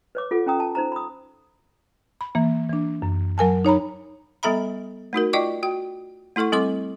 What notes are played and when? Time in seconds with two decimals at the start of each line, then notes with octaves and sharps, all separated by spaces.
0.15 B4 C#5 D6
0.31 F4 A4 F#5
0.46 C#4 G5 A#5 D#6
0.60 A5
0.75 D#4 C5 A#5
0.92 B5 D#6
2.21 B5
2.35 E3 A#3
2.69 E3 D4
3.02 F#2
3.38 F#3 A#4 G#5 A5
3.65 D#4 C#5 A#5 B5
4.43 G3 B3 A4 E5 A#5 B5
5.13 A3 D#4 F#4 A#4
5.33 F4 D5 D#5 G5 C#6 D6
5.63 F#4 G5
6.36 A3 E4 A4 F#5 C#6
6.52 G3 C4 A4 C6 D6